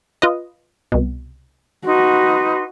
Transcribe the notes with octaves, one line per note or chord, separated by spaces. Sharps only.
F4 B4 D#5
C2 B2
D#4 F#4 B4 C6